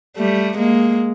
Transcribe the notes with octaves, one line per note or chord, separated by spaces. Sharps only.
G3 A3
G#3 A#3